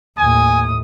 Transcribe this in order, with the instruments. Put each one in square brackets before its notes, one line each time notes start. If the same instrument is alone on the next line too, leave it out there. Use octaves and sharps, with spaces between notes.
[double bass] D#2 A2 [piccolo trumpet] G#5 [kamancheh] D#6